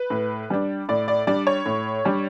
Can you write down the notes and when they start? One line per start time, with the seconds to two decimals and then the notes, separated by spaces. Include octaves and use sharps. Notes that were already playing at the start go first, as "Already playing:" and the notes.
Already playing: B4
0.10 A2
0.50 G3 D4
0.89 A2 D5
1.08 D5
1.27 G3 D4 D5
1.47 C#5
1.66 A2
2.05 G3 D4